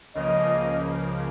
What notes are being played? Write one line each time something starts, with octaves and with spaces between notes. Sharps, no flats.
C#2 C#3 F3 A#3 D#5